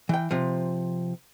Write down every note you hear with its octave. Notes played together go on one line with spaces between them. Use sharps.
E3 G5
C3 F3